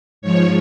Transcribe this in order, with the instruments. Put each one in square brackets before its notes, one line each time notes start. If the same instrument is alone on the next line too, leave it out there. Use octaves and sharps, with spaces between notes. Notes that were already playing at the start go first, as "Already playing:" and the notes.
[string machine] G#2 F3 C#5